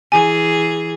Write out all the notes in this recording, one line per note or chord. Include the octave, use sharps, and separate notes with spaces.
E3 G#4 G#5